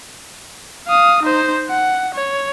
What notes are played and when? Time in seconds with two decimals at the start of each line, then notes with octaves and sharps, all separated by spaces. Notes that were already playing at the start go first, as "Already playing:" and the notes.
0.87 F5 D#6
1.23 D#4 C5
1.69 F#5
2.15 C#5